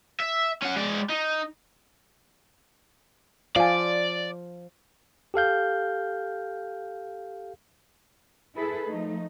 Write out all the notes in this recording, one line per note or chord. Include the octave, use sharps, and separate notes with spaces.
E5
C#4 F#5
G#3 D5
D#4
F3 F4 D5 F5 G#5
G4 A4 F5 G6
E4 G#4 A4 B4
F3 A3 D#4